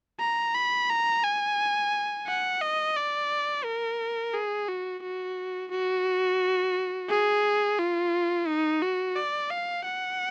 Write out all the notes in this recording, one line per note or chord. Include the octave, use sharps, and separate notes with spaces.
A#5
B5
A#5
G#5
F#5
D#5
D5
A#4
G#4
F#4
F#4
F#4
G#4
F4
D#4
F#4
D5
F5
F#5